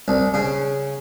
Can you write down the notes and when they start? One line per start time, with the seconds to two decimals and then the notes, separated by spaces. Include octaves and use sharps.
0.08 C2
0.34 C#3